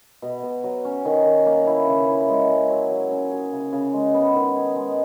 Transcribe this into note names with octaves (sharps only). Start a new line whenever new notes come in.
B2
B2
F#3
C#4
D#3
D#3
A#3
E4
C#3
E4
G#3
C#4
F#3
F#3
C#4
G#4
C#3
C#3
G#3
B3
D#3
G#4
G#3